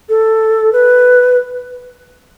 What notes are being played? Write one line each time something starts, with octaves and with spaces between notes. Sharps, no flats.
A4
B4